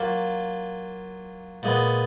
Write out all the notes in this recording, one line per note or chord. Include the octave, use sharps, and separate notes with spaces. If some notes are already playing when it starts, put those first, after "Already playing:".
Already playing: F#3 A#3 F4
A#2 G#3 B3